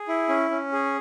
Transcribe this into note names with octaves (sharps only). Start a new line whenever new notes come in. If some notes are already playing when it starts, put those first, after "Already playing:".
Already playing: G#4
E4
C#4
C#4
G#4